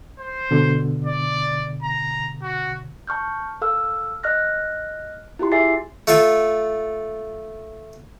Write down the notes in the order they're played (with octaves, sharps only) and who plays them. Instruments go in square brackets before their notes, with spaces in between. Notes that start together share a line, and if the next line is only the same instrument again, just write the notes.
[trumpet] C5
[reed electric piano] B2 D3
[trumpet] D5
A#5
F#4
[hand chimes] A5 C#6 F6 G6
A4 F5 E6 F6
D#5 F6 F#6 A#6
E4 F4 G4 C6
G#4 E5 G#5 D6 A6 C7
[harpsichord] A3 F4 A4 C#5